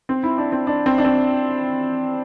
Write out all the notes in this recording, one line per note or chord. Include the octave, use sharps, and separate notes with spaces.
C4
E4
D4
C4
D4
C4
D4
C4